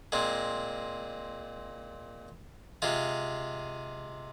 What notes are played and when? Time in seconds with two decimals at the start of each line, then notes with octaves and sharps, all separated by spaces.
0.12 A#2 G#3 C4
2.82 C3 G#3 F4